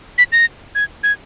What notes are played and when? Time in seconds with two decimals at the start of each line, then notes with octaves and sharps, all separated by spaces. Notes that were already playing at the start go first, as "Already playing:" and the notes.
0.18 B6
0.32 A#6
0.75 G#6
1.04 G#6